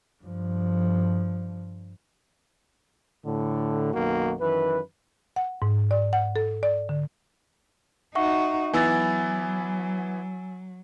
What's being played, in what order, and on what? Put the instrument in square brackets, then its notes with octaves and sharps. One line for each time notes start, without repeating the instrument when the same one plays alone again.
[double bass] G2 F3
[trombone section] A2 D3
B1 F#2 D#3 A#3 F#4
F#2 D#3 E3 B4
[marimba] F#5
G#2
D5
F#5
A4
D5
D3
[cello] D#4 F#4 [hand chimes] E5 F#5 C#6
[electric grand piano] E3 B3 E4 [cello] F#3 [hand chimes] G#5 E6 A6